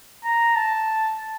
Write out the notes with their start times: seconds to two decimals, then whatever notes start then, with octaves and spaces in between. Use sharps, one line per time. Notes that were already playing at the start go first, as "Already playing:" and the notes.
0.24 A#5
0.56 A5